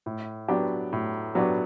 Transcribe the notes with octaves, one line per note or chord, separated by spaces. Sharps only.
A2
F#3 B3 D4 G4
A2
F#3 B3 D4 G4